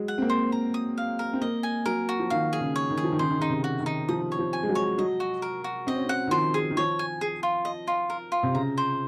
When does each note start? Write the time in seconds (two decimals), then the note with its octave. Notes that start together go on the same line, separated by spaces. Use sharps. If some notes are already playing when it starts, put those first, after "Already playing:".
Already playing: F#3 G#3
0.08 F#5
0.18 C4
0.22 A#3
0.30 C5
0.52 A#5
0.74 D#6
0.98 F5
1.19 A#4
1.33 C4
1.41 A#3 D#5
1.63 G#5
1.86 F#3 A#4
2.09 F#4
2.20 F3
2.30 D#3 F5
2.53 G#4
2.61 C#3
2.76 C#5
2.90 D#3
2.97 G#4
3.04 F3
3.12 D#3
3.19 C#3 C5
3.30 D#3
3.39 C#3 D#4
3.49 C3
3.64 F#4
3.80 D#3
3.86 D#4
4.09 F3 D#6
4.32 C#5
4.39 F3
4.53 G#5
4.63 G#3
4.68 F#3
4.75 C#5
4.98 F#3 D#5
5.20 F#4
5.42 A#4
5.64 F#4
5.87 C4 D#5
5.96 C#4
6.06 C4 F#5
6.27 D#3
6.31 F3 C5
6.54 G#4
6.71 D#3
6.77 F3 C#5
6.99 G#5
7.21 G#4
7.43 F4
7.65 D#5
7.88 F4
8.10 A#4
8.32 F4
8.43 C3
8.55 C#3 A#5
8.78 C5